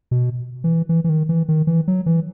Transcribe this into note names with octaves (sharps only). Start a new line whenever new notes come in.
B2
E3
E3
E3
D#3
E3
D#3
E3
F#3
E3